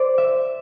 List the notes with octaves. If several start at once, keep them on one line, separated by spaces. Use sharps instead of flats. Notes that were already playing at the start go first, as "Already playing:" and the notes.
Already playing: C5 D5
E5